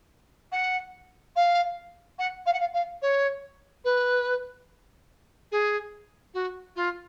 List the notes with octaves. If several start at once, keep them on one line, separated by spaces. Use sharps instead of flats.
F#5
F5
F#5
F5
F#5
F5
F5
C#5
B4
G#4
F#4
F4